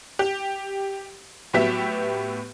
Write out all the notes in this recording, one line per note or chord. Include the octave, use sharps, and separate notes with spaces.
G4
A2 F#3 B3 G4 E5 B6